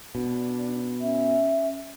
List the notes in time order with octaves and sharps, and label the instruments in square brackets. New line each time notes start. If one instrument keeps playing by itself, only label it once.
[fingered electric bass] B2 [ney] D4
[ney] C#4 [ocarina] E5